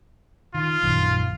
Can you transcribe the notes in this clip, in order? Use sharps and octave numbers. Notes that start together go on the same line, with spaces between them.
D#3 F4
A#1 F#2 D#3